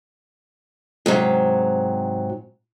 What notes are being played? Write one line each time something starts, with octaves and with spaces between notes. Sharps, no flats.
G#2 C3 F#3